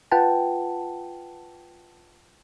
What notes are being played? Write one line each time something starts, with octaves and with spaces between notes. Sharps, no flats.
F4 B4 F#5 G5 A5